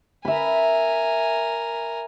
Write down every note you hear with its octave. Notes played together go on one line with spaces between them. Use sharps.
A#4 E5 G#5 B5